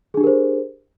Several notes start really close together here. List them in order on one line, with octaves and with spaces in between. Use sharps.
G#4 D4 G4 A#4 C5